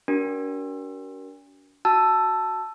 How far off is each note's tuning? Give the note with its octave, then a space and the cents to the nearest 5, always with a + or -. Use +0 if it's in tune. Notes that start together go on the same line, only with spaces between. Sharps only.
D4 -45 F#4 +35 A#4 +20
F#4 +0 A5 +0 E6 +10